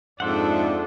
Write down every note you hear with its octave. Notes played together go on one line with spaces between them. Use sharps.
F2 G#2 D4 A4 C5 E5 F#5